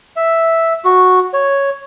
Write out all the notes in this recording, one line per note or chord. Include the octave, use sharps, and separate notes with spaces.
E5
F#4
C#5